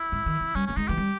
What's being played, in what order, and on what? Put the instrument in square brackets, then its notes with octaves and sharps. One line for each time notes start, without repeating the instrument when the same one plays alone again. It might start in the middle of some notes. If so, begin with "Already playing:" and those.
Already playing: [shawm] E4
[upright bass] G#2
D#3
E3
[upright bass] G3 [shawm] C#4
[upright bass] A#3 [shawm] C#4
[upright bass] G#3 [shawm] D#4
[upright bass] E3 [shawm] G4
[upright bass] G3